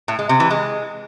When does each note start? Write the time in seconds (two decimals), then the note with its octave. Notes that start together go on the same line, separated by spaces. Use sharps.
0.08 A2
0.19 G#3
0.29 C3
0.40 E3
0.50 G#3